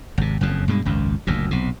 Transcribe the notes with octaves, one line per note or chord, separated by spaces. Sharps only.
G#1 C3
F#1 F2 C#3
G2 B2 G#3
G#1 C#2 F#2
F#1 D2 A#2
B1 C3